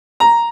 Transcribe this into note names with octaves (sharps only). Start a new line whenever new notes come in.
A#5